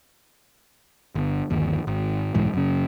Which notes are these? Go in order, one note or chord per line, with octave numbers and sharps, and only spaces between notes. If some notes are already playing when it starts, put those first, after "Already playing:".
G1
G1 D#2
G#1
F#1 B1 G#2 E3
F#2 C#3